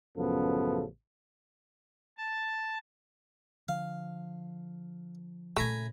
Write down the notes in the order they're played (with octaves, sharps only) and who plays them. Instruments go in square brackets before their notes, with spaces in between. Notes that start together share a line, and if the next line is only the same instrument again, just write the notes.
[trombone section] A1 F#2 C#3 F3 B3 A4
[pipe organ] A5
[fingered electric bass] D3 F3 [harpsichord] F5
[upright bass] A#2 C#3 [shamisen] A3 [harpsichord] G#5 A#5 B5